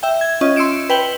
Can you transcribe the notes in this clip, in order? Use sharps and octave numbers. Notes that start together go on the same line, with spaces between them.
E5 G5
G#6
C#4 F4 D#5
C6 E6 C#7 D7 E7
B4 G5 F#7 G7